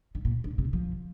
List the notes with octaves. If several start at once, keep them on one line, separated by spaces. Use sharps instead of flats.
D3
A#2
D3
C3
F3